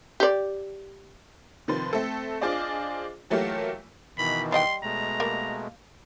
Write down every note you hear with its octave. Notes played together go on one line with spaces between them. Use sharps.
G4 D5
C3 D#3 F3 B4 C6 A6
A3 C4 A4
D4 F4 G#4 C5 D5 D#5
E3 F#3 A3 A#3 F4 G4
B2 D#3 E3 B5
G3 D#5 G5 C6
B2 G#3 A3 A#5
G3 A#3